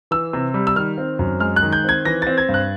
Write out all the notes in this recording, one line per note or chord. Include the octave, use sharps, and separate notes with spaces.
E3 E6
C3
G3
E6
D#3 F6
C4
F#2
G#3 F6
F#6
D#3
G6
C4 G#6
E3 A#6
C4 A6
G#6
G2
F#6